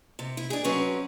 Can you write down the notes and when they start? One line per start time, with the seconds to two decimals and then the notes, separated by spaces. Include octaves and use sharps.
0.19 C3
0.37 E4
0.50 D4 G#4
0.64 F#3 C4 C#4 B4